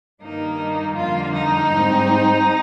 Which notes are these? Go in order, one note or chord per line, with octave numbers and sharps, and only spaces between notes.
G2 D#3 G3 A#3 D#4
F2 D3 G3 A#3 F4
D#4
G#2 G3 C4